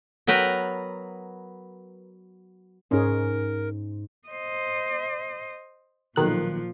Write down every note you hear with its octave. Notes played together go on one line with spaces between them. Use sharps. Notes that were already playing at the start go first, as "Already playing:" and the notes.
F#3 B3 A#4 B4 G5
G#2 C#4 D#4 G#4 A#4
C5 D#5
B1 A#2 D#3 F3 F#6